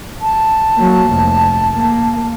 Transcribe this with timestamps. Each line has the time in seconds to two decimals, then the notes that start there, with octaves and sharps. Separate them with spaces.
0.21 A5
0.75 F#3 A#3
1.12 F1
1.73 A#3